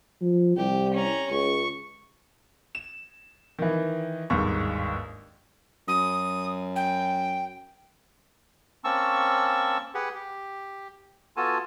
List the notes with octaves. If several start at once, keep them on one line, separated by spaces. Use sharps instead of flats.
F3
C2 G4
C#4 A#5
C#2 C#6
E7
D#3 E3
G1 D#2 G#2 C#6
F#2 D#6
G5
A#3 C4 C#4 A5 C#6 E6
G4 G#4 B4 F#5
G4
B3 F4 F#4 A4 G#5 A5